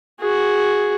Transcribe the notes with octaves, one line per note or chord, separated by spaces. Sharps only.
F#4 G#4